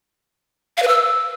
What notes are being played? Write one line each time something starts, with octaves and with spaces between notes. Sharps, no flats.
F5
B4
E6